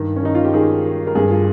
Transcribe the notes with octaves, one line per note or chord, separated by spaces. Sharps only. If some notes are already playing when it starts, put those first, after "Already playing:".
Already playing: G2 D#3
C#4
D#3 D#4
F4
G4
D#3 G#4
D#3
A#4
G2 G#4
F4